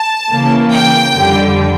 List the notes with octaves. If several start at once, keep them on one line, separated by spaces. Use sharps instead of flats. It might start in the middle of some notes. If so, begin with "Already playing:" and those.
Already playing: A5
C#3 E3 A#3
G5
F2 D3 G3